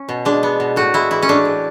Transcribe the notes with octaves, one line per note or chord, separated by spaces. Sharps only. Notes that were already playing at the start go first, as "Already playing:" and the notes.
Already playing: C#4
B2
G#3 D4
B3
B2
A2 F#4
G#3 E4
E3 E4
C#4
A2 D4
A2